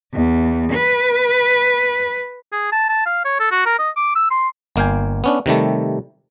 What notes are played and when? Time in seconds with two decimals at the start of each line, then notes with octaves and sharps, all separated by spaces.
0.15 E2
0.73 B4
2.53 G#4
2.72 A5
2.89 A5
3.06 F5
3.25 C#5
3.40 A4
3.52 F#4
3.66 A#4
3.79 D#5
3.97 D6
4.16 E6
4.31 C6
4.76 G1 A#3 F5 G5 G#5
5.24 B3 C#4 D4
5.46 C3 D#3 G3 A3